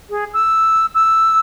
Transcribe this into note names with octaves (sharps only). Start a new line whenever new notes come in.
G#4
E6
E6